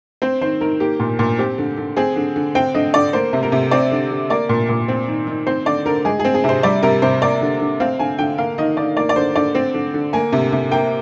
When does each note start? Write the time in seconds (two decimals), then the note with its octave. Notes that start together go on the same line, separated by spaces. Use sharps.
0.22 C4 C5
0.41 D#3 C5
0.61 D#3 A#4
0.80 A#3 G4
1.00 A#2
1.19 A#2
1.39 C4 G4
1.58 D3
1.77 D3
1.97 C4 G#4
2.16 D3
2.36 D3
2.55 C4 G5
2.74 D3 D#5
2.94 D3 D5
3.13 A#3 C5
3.33 C3
3.43 A#4
3.52 C3
3.71 C4 D5
3.91 D3
4.10 D3
4.30 A#3 D5
4.49 A#2
4.69 A#2
4.88 C4
5.08 D#3
5.27 D#3
5.47 C4 C5
5.66 D3 D5
5.85 D3 A#4
6.05 G#3 G#4
6.20 G#4
6.25 C4
6.34 G#4
6.44 C3 C5
6.63 G3 D5
6.83 C3 A#4
7.02 C3 C5
7.21 A#3 D5
7.41 D3
7.60 D3
7.80 C4 F5
7.99 D3 G#5
8.19 D3 G5
8.38 A#3 F5
8.58 D#3 D#5
8.77 D#3 D5
8.97 A#3 D5
9.09 D5
9.16 D3 C5
9.36 D3 D5
9.55 C4
9.74 D3
9.94 D3
10.13 A#3 G#5
10.33 C3
10.52 C3
10.72 A#3 G5